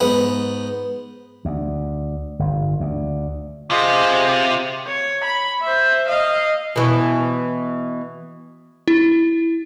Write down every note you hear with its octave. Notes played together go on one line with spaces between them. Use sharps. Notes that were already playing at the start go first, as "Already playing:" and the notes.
G#2 B3
D2
G1
D2
C3 F4 G#4 C5 D#5
C#5
B5
C5 E5
D#5 F5
B2 E3
E4